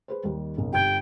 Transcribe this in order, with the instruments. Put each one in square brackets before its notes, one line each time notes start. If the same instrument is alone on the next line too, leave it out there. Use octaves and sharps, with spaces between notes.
[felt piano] G#4 B4 C5
D#2 D#3 G3
F#1 B1 A#3
[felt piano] G1 G4 G#6 [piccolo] G5